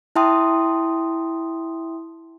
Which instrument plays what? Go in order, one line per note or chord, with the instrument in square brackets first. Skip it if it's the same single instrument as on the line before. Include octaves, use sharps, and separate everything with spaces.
[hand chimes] E4 E5 G5 A5 C6 D#6